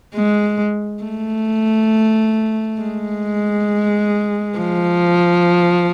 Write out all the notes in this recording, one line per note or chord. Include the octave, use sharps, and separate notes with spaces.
G#3
A3
G#3
F3